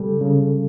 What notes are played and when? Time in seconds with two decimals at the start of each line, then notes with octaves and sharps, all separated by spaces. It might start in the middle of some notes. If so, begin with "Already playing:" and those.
Already playing: C#3 G3 A4
0.21 C#3